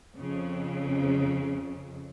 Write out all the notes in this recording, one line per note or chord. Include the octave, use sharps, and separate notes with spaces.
F2 C#3